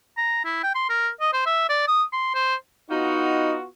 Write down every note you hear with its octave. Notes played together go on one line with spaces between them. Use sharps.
A#5
E4
G5
C6
A#4
D#5
C5
E5
D5
D#6
C6
C5
B3 D#4 F4 F#4